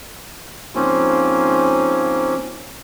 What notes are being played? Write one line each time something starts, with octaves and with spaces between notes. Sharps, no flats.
G#2 F3 A#3 C4 C#4